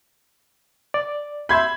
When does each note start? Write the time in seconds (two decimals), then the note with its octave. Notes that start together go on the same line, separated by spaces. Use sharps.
0.94 D5
1.49 E5 B5 C6 G6 G#6